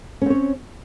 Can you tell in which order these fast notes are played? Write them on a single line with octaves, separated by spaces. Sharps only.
C#4 C4 C#5